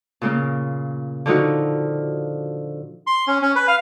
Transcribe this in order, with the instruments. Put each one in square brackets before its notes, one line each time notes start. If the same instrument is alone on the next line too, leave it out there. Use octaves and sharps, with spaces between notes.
[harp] A#2 C#3 A#3
D3 F3 D#4 F#4
[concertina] C6
C#4
C#4
B4
F5